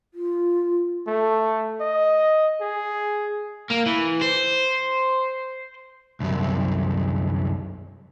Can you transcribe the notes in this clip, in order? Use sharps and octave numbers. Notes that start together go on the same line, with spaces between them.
F4
A3
D#5
G#4
A#3
E3
C5
C2 F#2